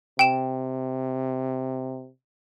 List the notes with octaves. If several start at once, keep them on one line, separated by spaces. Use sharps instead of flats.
C3 G5 E7